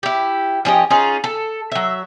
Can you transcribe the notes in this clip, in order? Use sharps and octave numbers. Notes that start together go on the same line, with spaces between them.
E4 G4
F3 C#4 G4 D#5
C#4 D#4 F4 G#4
A4
F#3 E5